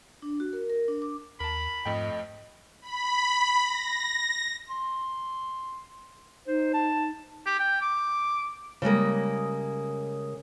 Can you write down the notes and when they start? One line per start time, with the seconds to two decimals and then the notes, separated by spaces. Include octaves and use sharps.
0.22 D4
0.40 F#4
0.53 A#4
0.70 A#4
0.88 D4
1.02 D6
1.40 D#2 A#4 A5 B5
1.85 F2 G#2 A3 D#5 G5
2.82 B5
3.62 A#6
4.69 C6
6.48 D#4 C5
6.74 A5
7.46 G4
7.59 G5
7.81 D6
8.82 C#3 G3 G#3 A#3